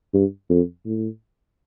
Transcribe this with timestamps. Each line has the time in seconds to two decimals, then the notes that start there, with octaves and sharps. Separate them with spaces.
0.14 G2
0.50 F2
0.86 A2